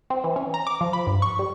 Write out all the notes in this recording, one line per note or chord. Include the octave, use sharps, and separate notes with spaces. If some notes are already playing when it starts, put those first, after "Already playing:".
C4
E3
C#4
A#5
D6
F3
B5
G2
C#6
G3